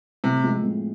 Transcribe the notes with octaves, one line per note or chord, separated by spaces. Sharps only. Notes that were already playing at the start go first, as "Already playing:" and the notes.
A2 C3
F3 G#3 C4
A2